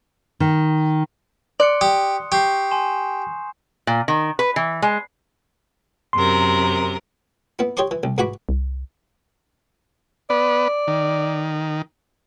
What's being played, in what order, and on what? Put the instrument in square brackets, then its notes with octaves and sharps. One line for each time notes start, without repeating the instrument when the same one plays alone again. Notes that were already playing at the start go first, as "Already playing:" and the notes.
[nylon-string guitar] D#3
[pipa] D5 [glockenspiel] C6 F#6 C#7
[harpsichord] G4 [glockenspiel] D#6
[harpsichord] G4 [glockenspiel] C#6 G6 C7
[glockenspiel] G#5 C6 E7
[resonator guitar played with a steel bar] A#2
D#3
B4
E3
G#3
[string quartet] F#2 C3 A#4 [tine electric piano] C6
[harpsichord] B3 E4
G4 C#5 D#5 C6 D6
E3
C2
G#2 E3 F#4 F#5 B5 D6
[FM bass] C2
[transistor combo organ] B3 B4 [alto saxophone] D5
[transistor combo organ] D#3